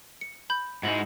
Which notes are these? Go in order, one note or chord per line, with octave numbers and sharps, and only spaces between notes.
C#7
B5 G6
G#2 G#3 D#4 E4 F#4